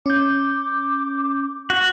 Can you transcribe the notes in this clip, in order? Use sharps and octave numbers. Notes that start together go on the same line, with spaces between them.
C#4 D6 G6
F#4